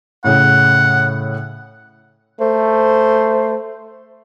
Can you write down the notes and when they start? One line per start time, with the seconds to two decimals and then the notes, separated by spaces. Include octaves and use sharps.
0.24 A2 C#3 F#5
2.40 A3 C5